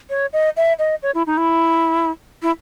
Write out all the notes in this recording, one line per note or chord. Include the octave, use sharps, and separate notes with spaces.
C#5
D#5
E5
D#5
C#5
E4
D#4
E4
E4